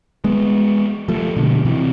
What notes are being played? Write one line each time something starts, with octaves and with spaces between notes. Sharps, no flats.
G#3 B3
F3 A3
B2 D3
C3 E3